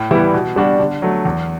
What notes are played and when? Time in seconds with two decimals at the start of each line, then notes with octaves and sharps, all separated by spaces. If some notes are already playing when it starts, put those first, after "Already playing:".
Already playing: A2
0.11 E3 G3 B3 E4
0.34 B2
0.56 G3 D4 F#4
0.79 D3
1.02 F#3 A3
1.25 E2